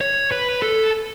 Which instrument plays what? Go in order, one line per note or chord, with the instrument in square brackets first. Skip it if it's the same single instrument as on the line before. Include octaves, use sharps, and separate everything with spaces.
[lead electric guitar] C#5
B4
A4